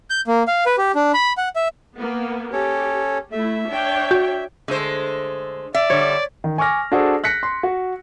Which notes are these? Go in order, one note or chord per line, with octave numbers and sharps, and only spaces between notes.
G6
A#3
F5
B4
G4
D4
B5
F#5
E5
A#3 B3
C#4 G4 A4 C#5
A3 E4 E5
D4 C#5 G5
F#4 G6
D3 G#3 A3 C5
D5 E5
D3 G3 C#5
D#3
G#5 C#6 D6 F6 A#6
D4 F#4 G#4 A4 C5
F#6 A#6 B6 C#7
C6
F#4